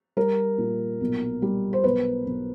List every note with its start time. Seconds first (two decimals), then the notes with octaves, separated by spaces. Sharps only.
0.17 G3 A#4
0.58 A#2
1.01 B1
1.42 G3
1.73 C5
1.84 B1 B4
2.26 B1